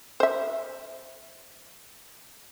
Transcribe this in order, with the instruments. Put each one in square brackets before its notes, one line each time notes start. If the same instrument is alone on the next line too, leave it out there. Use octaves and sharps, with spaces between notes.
[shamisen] C5 E5